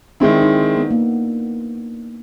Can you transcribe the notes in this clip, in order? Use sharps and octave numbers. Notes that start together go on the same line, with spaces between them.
D#3 G#3 C4 D4 E4
D#4
D4
B3
A#3